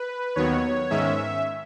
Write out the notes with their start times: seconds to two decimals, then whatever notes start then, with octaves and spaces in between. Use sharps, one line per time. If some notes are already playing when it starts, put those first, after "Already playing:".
Already playing: B4
0.36 D#2 D#3 F#3 B3 C#5
0.90 G#2 D#3 G#3 C#4 E5